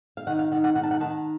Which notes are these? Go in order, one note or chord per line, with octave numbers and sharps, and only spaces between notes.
F5
D#3 F#5
F5
D#3 F#5
F#5
D#3 F#5
A5
F#5
D#3 A5